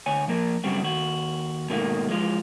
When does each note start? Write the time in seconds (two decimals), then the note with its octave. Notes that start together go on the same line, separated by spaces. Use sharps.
0.06 D2 C#5 G#5
0.28 F3 A#3 A#4
0.64 F#2 C#3 G3 A3 C4 F#4
0.83 D#2 F#4
1.70 G#2 B2 D#3 A3 A#3
2.09 E3 F3 G#3 F4